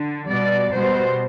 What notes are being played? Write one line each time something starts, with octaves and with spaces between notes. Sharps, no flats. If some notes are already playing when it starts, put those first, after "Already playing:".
Already playing: D3
B2 G3 D5
B2 G3 C5